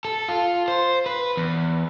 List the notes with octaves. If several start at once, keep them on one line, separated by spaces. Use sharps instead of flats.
A4
F4
C5
B4
E2